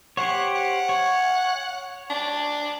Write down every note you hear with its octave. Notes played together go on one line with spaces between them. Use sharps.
G4 C5 C#5 F#5
F#5
C#5
D4